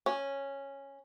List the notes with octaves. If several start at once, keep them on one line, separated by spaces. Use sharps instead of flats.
C#4